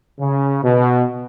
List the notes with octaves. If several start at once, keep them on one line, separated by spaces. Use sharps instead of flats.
C#3
B2